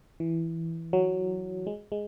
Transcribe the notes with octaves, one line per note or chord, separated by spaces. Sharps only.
E3
F#3
G#3
G#3